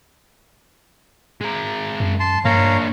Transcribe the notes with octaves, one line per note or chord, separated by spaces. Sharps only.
G#3 A#4
F#2
A5 C6
G2 A#3 D4 C#5 F5 A#5